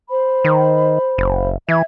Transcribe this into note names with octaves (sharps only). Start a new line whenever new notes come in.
C5 B5
D#3
F#1
E3 E5 G#6